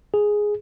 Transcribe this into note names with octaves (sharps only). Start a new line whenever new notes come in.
G#4